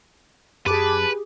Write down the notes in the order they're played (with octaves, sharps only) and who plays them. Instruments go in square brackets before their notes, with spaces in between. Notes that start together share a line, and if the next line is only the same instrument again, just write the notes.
[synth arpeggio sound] F#2 A5 D6 [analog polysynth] G4 G#4 [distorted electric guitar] B4